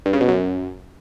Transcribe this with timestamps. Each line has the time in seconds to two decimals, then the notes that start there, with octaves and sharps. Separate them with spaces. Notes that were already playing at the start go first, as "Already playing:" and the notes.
0.06 G2
0.13 C#3
0.20 B2
0.28 F#2